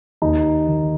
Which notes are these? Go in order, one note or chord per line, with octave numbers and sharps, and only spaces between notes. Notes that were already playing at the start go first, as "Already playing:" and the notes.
D#2 D#4
D#3